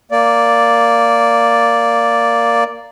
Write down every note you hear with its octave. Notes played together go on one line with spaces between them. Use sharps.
A#3 D5